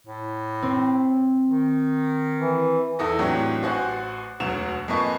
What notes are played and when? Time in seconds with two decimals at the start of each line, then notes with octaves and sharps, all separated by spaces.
0.07 A2
0.63 C4
1.47 D#3
2.40 E3
2.99 E2 E4 A4 E5 D#6 A#6
3.19 A2 E3 F#3 C4 D4 G4
3.63 A1 F#4 C5 F#5 G#5 F#6
4.40 E1 D2 F#3 E7 F7
4.88 F2 A#3 B4 D#5 G#5 C#6